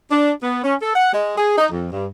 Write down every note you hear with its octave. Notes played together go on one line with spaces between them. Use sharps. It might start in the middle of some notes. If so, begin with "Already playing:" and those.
D4
B3
C#4
A4
F#5
G#3
G#4
D#4
F2
G2